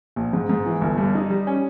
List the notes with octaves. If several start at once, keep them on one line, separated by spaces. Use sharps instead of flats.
A#1
G#2
G#2
E3
G1
G2
D#4
G3
C#4